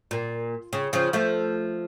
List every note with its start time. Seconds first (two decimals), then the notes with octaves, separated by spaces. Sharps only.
0.11 A#2
0.73 C#3
0.93 C#3 F3
1.13 F3 A3